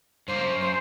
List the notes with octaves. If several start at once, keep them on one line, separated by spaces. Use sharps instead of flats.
G2 A#3 C5
F#2
C5